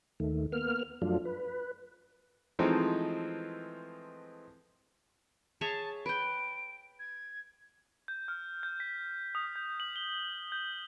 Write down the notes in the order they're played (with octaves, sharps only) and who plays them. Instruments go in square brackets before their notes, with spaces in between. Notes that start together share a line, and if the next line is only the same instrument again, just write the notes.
[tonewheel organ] D#2 D#3 A3
A#3 B3 F6
F#2 F3 F#3 A3 D4 F4
B4
[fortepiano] E3 F3 G#3 A3 C4 D#4
[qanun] G#4 C#5 E5 [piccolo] A5
[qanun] B4 G5 [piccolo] D7
[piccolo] G#6
[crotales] G6
F6
G6
B6
D#6
G6
F#7
G7
G6